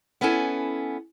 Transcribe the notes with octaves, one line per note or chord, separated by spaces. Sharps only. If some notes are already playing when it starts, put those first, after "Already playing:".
B3 C#4 E4 A4 G#5